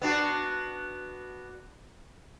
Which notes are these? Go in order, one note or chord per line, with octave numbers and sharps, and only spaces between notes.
B3 D4 F#4